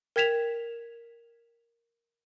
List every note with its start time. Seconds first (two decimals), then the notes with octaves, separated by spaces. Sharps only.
0.16 A#4 G5 G#6 B6 E7 F7